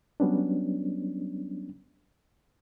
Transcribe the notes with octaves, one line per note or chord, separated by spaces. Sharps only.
F#3 G3 B3 C#4 D4